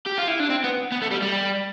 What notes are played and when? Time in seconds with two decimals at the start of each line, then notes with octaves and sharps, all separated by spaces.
0.06 G4
0.18 F4
0.27 E4
0.40 D4
0.50 C4
0.64 B3
0.92 B3
1.02 A3
1.11 G3
1.22 G3